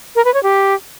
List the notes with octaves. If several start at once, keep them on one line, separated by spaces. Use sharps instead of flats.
A#4
B4
C#5
G4